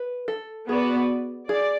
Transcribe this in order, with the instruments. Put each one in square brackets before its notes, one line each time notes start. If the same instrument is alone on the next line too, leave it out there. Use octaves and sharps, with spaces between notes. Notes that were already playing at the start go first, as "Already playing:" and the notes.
Already playing: [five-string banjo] B4
A4
[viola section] B3 F#4 B4 D5 [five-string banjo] G#4
[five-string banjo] G#4 [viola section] D5